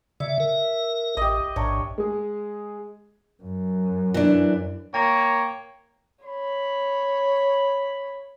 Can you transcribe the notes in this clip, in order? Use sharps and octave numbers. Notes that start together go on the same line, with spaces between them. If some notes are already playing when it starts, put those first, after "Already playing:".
C#3 D5 E5
A#4
A1 G4 D#5
A1 G#2 D4 A#4 C#5
G#3 G#4
F#2
E3 D4
A#3 C#5 G5
C#5 B5